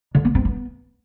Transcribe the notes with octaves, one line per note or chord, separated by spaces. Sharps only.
D3
B3
C4
B3